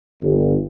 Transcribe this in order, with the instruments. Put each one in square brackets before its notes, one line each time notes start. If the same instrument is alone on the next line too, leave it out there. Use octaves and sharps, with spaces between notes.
[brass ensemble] G1